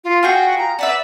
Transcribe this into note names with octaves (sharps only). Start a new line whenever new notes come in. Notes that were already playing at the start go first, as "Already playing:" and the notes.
F4
F4 F#4 G#4 G5
A#5
F#4 B4 D5 E5